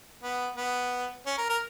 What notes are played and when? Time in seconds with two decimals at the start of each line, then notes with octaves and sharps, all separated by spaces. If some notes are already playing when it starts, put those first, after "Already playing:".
0.23 B3
0.57 B3
1.26 C#4
1.38 A#4
1.49 A#4